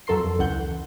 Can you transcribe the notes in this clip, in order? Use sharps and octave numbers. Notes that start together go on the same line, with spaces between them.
F2 F#3 A4 A#4 C6 C7
C#2 E3 F#5 G6